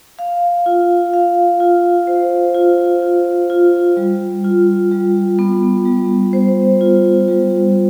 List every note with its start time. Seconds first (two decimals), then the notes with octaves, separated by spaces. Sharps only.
0.19 F5
0.66 F4
1.14 F5
1.60 F4
2.07 C5
2.54 F4
3.02 F4
3.50 F4
3.97 G3
4.44 F4
4.92 G3
5.39 B3
5.85 G3
6.33 C5
6.81 F4
7.28 G3